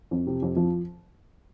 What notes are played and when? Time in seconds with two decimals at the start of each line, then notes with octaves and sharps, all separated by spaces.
0.11 F2
0.27 C3
0.42 F2
0.56 F3